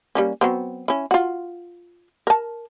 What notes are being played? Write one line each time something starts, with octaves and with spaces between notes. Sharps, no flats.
G3 A#3 C#4
F#3 B3 C4
C#4 E4
F4 F#4
A#4 A5